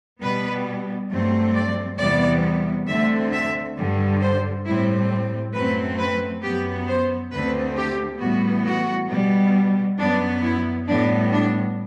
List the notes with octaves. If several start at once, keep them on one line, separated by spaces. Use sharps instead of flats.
B2 G3 B3 B4
G2 F#3 A3 C4
D5
E2 C3 G3 B3 D5
D2 D3 A3 C4 E5
E5
G2 D3 G3
C5
A2 G3 C4 E4
F#2 F#3 A3 C4 B4
B4
F#2 F#3 B3 G4
C5
D2 D3 A3 C4 B4
G4
A2 E3 G3 B3 F#4
F#4
B2 G3 B3
F#2 F#3 B3 D4
E4
A2 G3 B3 D4
D4